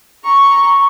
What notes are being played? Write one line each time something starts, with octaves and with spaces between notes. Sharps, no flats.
A#5 C#6